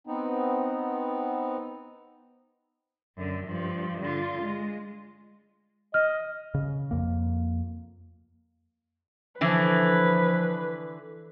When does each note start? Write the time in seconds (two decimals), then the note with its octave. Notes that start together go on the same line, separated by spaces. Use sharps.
0.07 B3 C4 D#4
3.16 F#2 D3
3.47 G2 F3
4.01 D3 F4
4.42 G#3
5.94 D#5 F6
6.54 C#3
6.91 F2 A#3
9.41 D3 E3 F3 B4